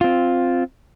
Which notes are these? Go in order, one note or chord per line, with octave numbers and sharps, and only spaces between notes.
C4 F4